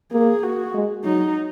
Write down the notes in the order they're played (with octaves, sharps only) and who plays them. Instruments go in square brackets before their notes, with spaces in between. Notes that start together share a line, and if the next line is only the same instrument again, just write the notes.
[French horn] A#3 [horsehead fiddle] G#4
[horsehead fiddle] F#4
[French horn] G#3
[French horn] F#3 [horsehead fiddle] D#4